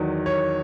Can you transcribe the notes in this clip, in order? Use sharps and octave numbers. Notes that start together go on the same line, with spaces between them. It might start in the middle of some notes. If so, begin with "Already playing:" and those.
Already playing: E2 D#3 F#3
C#5